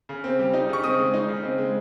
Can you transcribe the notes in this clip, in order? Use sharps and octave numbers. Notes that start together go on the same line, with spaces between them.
C#3
C4
G3
D#4
C#3 C#6
C4 D#6
G#3
D#4
C#3
C4
G#3